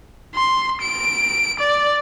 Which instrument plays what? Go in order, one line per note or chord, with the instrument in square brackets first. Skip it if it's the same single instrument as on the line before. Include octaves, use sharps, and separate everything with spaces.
[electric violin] C6
D7
D5